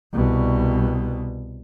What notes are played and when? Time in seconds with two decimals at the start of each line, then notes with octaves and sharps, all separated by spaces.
0.14 C2 B2